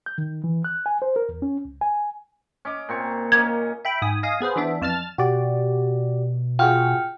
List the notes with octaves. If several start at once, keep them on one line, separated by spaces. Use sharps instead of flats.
G6
D#3
E3
F#6
G#5
C5
A#4
E2
C#4
C#2
G#5
C#4 D#5 D6
A#2 C4 C#6
A#3 C#4 D#5 G#6
E5 G5 B5
G#2 G#5 D#6
D#5 F5 G#5 D#6
B3 G#4 B4 C5
E3 B3 D4 E5
F2 A5 F6 A6
B2 F#4 G4 D5
F4 F#4 G#4 G5 F6